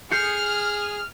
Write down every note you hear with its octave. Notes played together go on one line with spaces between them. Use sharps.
G#4 F6 G6 C7 C#7